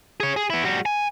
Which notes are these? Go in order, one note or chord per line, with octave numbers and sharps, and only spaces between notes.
G#4 C#5
G#4
B3 E4
G3 F#4
G#5